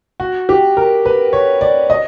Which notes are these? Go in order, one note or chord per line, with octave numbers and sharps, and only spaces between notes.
F#4
G4
A#4
B4
C#5
D5
D#5